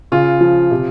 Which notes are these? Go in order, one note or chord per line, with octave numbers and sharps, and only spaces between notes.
C#3 F4
F3
C3